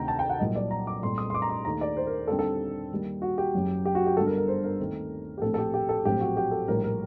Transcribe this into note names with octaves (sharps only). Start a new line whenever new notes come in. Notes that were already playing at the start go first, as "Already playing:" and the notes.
Already playing: D2 C3 D#3 G5 A#5
A5
G5
F#5
C2 A#2 F#3 A#3 D#5
D5
A#5
D6
C2 A#2 A3 C4 C6
D#6
C6
D6
A#5
C6
D#2 D#3 A3 A#5
D5
C5
A#4
D#2 D3 G3 C4 A4
A4
D#2 D#3 G3 A#3
F#4
G4
F#1 F#2 F#3
G4
F#4
G4
G1 G2 D3 A4
A#4
A#4
C5
A#4
D#2 D#3 A3 C4
G4
A#1 A2 A3 C4 A4
A4
G4
G4
A4
A#1 A2 F#3 C4 G4
F#4
G4
A4
A#1 A2 G3 A#3 A#4
A#4